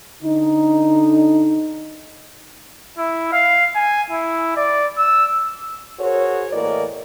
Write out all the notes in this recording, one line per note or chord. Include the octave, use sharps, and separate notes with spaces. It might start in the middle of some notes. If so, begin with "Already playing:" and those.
D3 D#4
E4
F5
G#5
E4
D5
E6
F#4 G#4 A#4 C5 C#5
A2 E3 A#3 A#4 D5 D#5